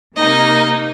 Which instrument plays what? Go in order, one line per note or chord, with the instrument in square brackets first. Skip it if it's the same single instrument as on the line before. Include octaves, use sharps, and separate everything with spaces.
[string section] C3 A#3 D#4 [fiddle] D#5